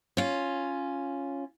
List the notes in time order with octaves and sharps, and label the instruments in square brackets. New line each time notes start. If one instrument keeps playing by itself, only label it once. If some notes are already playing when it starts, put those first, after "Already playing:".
[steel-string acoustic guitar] C#4 F4